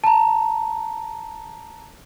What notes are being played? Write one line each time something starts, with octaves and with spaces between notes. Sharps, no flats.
A5 A#5